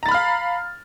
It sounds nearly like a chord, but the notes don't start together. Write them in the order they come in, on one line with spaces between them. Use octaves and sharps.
A#5 A6 B5 F6 F5